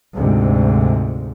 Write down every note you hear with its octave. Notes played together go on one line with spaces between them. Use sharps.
D2 G#2 C3